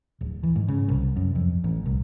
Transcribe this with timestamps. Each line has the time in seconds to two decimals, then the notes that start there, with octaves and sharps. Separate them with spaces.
0.21 D1
0.43 E3
0.56 G#2
0.68 C#3
0.88 C2
1.16 F#2
1.35 F2
1.64 A1
1.86 C2